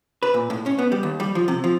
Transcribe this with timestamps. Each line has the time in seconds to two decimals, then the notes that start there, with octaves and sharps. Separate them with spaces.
0.23 B4
0.34 A#2
0.50 A2
0.66 C#4
0.79 B3
0.92 G3
1.03 D#2
1.20 G3
1.35 F3
1.48 C3
1.64 F3